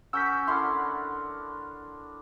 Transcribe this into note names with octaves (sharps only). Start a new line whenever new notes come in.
C#4 F#4 A#4 E6 G6 B6
D3 D4 E4 C6 F6